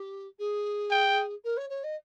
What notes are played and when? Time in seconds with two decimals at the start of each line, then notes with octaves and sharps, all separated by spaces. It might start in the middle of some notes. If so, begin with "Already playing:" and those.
Already playing: G4
0.39 G#4
0.91 G5
1.44 A#4
1.57 C#5
1.69 C#5
1.83 D#5